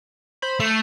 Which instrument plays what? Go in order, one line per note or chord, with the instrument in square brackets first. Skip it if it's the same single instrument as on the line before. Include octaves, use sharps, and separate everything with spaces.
[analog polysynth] C5 B5
[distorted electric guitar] A3 [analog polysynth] C7